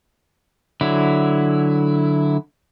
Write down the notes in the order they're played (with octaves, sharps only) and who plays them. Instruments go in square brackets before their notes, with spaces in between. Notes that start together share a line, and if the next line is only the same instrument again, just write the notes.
[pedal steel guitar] D3 F#3 E4